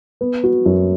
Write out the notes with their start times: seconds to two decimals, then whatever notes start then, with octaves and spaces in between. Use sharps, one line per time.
0.21 B3
0.44 F#4
0.66 F#2